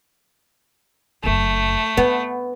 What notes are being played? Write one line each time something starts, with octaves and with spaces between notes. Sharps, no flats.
F#1 F#2 A3
B3 D4